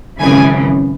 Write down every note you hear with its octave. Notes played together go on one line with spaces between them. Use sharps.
G#1 F#2 C#3 E3 G#5